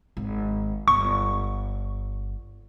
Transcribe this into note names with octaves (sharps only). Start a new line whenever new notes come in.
G#1
G1 C#6